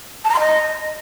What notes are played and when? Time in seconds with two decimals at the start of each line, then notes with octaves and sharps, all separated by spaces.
0.25 A5
0.30 A#5
0.35 C6
0.40 D#5